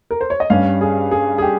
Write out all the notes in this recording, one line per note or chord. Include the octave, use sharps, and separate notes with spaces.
A#4
C5
C#5
D#5
G2 G3 C#4 F5
G#4
G#4
G#4
G4